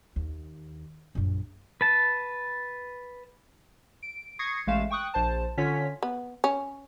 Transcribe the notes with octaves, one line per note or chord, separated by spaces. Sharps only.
D#2
A#1 F#2
B4 A5
D7
C#6 D#6 G#6 A#6 C7 C#7
A1 G#3 A3 F5 E7
G5 C#6 D#6 F#6
A#1 C5 A5
D3 C#4 F4 C#5 B6
B3
C#4